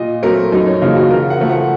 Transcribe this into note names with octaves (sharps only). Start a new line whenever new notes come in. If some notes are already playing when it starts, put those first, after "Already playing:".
Already playing: A#2 D#5
F#3 A3 C4 A#4
F#2 D#4
C#4
C#3 F3 A#3 D#4
F#4
C#3 A#4
F#5
F3 A3
F#5